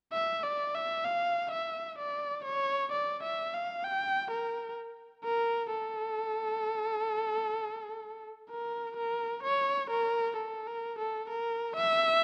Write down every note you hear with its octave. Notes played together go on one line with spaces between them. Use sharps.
E5
D5
E5
F5
E5
D5
C#5
D5
E5
F5
G5
A#4
A#4
A4
A#4
A#4
C#5
A#4
A4
A#4
A4
A#4
E5